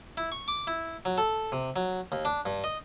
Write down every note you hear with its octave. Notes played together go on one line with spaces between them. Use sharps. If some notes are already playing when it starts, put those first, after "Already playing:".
E4
C#6
D6
E4
F#3
A4
C3
F#3
D#2
D4
G2
D#5